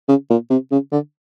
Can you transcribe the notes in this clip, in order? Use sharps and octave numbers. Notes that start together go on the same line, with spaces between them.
C#3
A#2
C3
C#3
D3